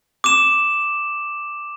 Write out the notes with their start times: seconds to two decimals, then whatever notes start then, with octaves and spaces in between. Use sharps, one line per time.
0.24 D6 E7